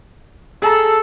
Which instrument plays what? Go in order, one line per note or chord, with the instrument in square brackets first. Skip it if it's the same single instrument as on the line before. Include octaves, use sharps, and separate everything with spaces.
[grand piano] G#4 A#5 [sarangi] A4